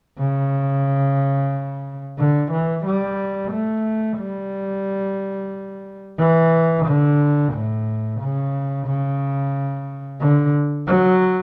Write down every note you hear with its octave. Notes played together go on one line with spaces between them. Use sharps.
C#3
D3
E3
G3
A3
G3
E3
D3
A2
C#3
C#3
D3
F#3